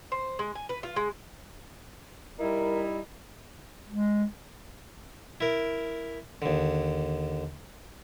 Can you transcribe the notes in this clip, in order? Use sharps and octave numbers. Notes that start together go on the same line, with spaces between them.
C5
G#3
G#5
B4
F4
G#3
G3 D#4 E4 A#4
G#3
E4 A#4
D#2 D3